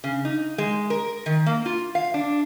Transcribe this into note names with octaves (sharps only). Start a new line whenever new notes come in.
C#3
D#4
G#3
A#4
D#3
A#3
F4
F5
D4